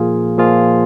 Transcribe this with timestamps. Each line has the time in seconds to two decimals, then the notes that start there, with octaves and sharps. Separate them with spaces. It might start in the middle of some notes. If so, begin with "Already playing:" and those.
Already playing: A#2 F3 A#3 F4 G#4
0.38 A#2 F3 A#3 F4 G#4